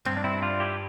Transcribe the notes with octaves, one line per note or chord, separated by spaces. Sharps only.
G2 C4
D4
C4 E4
D4 F4
E4 G4